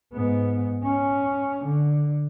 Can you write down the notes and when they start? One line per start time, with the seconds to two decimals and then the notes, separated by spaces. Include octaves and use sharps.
0.14 G#2 B3
0.84 C#4
1.65 D3